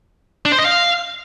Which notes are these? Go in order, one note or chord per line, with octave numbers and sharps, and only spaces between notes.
D4
C5
D#5
F5